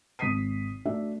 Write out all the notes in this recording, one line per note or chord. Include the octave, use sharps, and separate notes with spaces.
G#1 D#6 B6 C7 D#7
A3 D4 F#4 E5